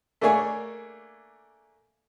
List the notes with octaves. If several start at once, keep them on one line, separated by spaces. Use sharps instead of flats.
A3 A#3 D4 G#4 C#5 G#5